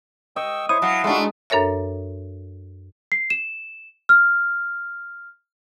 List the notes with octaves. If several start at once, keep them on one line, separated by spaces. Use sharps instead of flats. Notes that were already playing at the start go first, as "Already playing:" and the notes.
D#5 G5 C#6 E6
E4 C5 C#5 C#6 D#6
F#3 F5 F#5 A5
G#3 A3 D4 D#4 F#4
F#2 D4 A4 A#4 C#5 E5
C7
E7
F6